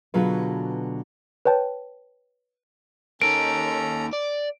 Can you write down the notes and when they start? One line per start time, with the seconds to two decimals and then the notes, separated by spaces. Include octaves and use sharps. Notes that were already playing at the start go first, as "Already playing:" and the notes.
0.14 B2 D3 F#3 F4 G#4 B4
1.45 B4 C#5 G5 A5
3.22 A#3 C#4 D#4 A4 A#5 D7
4.13 D5